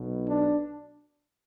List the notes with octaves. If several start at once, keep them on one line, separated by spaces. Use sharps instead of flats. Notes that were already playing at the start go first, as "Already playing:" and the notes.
Already playing: B1 B2
D4